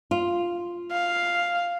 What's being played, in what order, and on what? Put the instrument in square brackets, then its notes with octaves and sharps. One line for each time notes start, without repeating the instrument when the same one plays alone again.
[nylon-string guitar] F4
[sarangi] F5